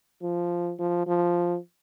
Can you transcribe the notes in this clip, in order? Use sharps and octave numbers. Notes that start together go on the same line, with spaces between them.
F3
F3
F3